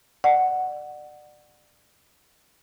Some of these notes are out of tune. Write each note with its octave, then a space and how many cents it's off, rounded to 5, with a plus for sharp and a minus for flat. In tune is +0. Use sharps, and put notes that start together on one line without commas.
D5 +30 F#5 +0